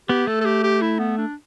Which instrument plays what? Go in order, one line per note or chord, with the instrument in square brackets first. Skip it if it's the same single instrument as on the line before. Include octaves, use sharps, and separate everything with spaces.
[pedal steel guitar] B3 [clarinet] G4
[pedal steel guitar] A3 [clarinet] A4
[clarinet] A4
G4
G4
E4
B3
D4